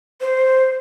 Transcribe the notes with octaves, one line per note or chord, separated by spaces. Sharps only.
C5